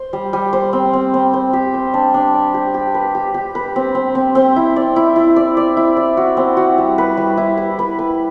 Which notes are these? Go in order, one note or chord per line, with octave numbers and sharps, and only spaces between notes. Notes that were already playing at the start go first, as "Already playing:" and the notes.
Already playing: C5
G3
G3
C5
C4
C4
C4
C5
G4
C5
D4
D4
D5
G4
G4
B4
G4
G4
B4
C4
C4
C4
C4
E4
D5
E4
E4
D5
D5
E4
D5
F#4
C4
F#4
G3
B4
G3
E4
B4
B4
B4